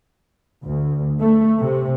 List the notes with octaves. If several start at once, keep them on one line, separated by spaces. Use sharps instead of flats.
D2
A3
C3